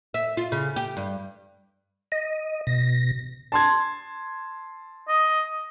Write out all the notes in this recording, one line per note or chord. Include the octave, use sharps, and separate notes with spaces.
E5
F4
C#3
G4
G2
D#5
B2 A#6
A5 C6 G#6
D#5